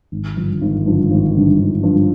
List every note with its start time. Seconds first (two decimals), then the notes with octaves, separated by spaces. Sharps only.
0.12 G#1
0.37 G2 D3 F3
0.61 G#1
0.86 G2 D3 F3
1.10 G#1
1.35 G2 D3 F3
1.59 G#1
1.83 G2 D3 F3